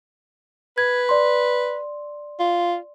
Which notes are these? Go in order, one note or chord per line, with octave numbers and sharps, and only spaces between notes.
B4 G#6
D5 C6
F4